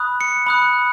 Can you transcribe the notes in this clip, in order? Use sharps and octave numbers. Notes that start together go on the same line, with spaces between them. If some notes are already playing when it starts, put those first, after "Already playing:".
Already playing: B5 D#6 F#6
C#7
B5 D#6 F#6